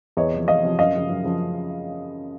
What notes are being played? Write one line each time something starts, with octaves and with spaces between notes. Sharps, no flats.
E2 C#5 D#5
C3 F3
E2 D#5 F5
C3 F3
F#2 D#5 F5
C#3 F3
F#2
C#3 F3